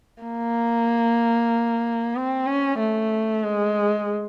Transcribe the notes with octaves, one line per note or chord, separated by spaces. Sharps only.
A#3
C4
C#4
A3
G#3